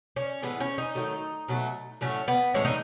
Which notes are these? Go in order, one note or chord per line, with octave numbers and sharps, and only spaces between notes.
C#4
A2 E3 G#3 B3
C#4
D#4
D#3 F#3 A3
B2 F#3 A3
A2 F#3 A3 C#4
B3
A2 E3 G#3 C#4
D#4